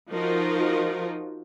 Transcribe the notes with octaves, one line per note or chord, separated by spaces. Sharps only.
F3 D#4 F4 F#4 A#4